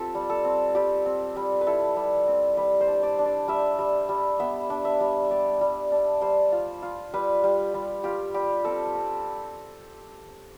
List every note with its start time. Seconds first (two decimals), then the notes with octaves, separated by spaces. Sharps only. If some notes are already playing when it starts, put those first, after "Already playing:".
Already playing: C4 F4 G4 A4
0.15 G3
0.30 A4
0.44 C4
0.75 G3 G4
1.06 C4
1.36 G3
1.61 B4
1.67 E4 A4
1.97 G3
2.28 C4
2.57 G3 B4
2.81 C5
2.88 D4
3.03 D5
3.19 D4
3.25 D5
3.48 G3 E5
3.79 G3
4.09 G3
4.40 B3 E5
4.70 D4
4.85 E5
5.00 G3
5.31 G3 D5
5.61 G3
5.92 D4
6.21 G3 C5
6.52 F4
6.82 F4
7.14 G3 B4
7.44 G3
7.74 G3
8.04 F4 G4
8.34 G3 G4
8.64 C4 A4
8.95 C4